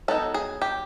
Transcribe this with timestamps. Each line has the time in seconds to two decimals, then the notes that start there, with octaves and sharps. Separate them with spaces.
0.08 F#3 B3 D#4 A4
0.34 G#4
0.62 G4